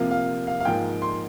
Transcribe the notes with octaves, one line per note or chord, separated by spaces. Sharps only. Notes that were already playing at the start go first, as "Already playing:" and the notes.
Already playing: C3 F3 A#3 F5
F5
F5
F5
G#2 F3 A#3 G5
C6